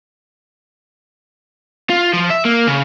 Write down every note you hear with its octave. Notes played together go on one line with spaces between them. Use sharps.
F4
F3
E5
A#3
C#3